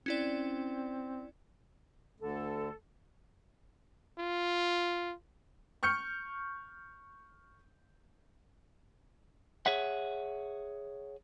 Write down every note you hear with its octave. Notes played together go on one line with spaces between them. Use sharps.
C4 C#4 E4 D5
D2 D3 A4
F4
C#6 F6 G6 C#7
G#4 C#5 E5 F#5